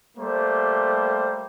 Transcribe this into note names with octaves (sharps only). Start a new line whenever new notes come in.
G3 A3 A#3 C5